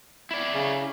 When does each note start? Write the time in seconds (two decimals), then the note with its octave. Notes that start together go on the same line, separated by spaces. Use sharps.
0.31 E4 D5
0.53 C#3